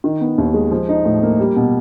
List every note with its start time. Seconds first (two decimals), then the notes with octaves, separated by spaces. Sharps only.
0.04 D#3
0.21 B3
0.38 D#2
0.54 G#3
0.71 F3
0.89 D#4
1.05 A2
1.23 A#3
1.40 G3
1.56 B2